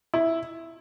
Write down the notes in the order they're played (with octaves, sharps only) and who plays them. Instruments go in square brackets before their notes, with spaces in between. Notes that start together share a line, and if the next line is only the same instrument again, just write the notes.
[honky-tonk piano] E4